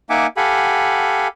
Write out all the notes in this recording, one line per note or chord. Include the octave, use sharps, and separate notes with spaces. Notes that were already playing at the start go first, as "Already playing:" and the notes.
A#3 D#4 E5 F#5 G#5 D6
G4 A4 F5 F#5 G#5 B5